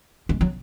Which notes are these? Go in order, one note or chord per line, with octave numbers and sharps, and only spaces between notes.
G#3
F#3